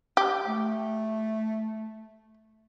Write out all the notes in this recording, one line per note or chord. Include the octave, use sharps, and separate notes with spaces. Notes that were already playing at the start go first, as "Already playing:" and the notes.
G4
A3